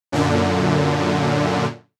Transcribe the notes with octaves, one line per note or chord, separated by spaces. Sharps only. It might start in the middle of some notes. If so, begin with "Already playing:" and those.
F#2 A#2 D3